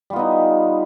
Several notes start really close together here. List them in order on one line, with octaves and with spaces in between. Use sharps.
G3 F4 B3 D#4